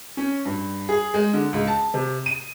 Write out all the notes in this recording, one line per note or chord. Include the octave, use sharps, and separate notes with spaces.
C#4
G2
G#4
G#3
D3
C#2
A5
C3
D#7